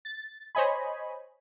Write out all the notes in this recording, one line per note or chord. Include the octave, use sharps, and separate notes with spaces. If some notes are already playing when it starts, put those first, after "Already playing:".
A6
C5 C#5 D#5 G#5 B5